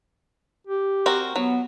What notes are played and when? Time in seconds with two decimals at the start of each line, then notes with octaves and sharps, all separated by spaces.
0.67 G4
1.06 C4 F#4 A#4
1.36 F#3 B3